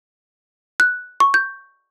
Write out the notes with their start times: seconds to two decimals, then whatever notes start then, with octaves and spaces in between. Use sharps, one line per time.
0.80 F#6
1.20 C#6
1.34 G6